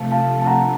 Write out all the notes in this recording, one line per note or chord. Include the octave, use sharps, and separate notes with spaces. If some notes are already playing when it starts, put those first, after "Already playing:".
Already playing: C3 F3 A3 F5 A5
F5 A5
A5
F#5 A#5